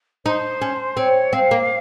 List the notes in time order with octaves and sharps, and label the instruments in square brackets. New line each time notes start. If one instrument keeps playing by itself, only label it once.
[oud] D#4 [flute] C5
[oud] C#4
[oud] C4 [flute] C#5
[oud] C4 [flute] F5
[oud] A#3